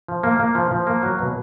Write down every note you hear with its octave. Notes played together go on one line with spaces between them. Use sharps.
F3
A#3
A#3
F3
F3
A#3
F#3
B2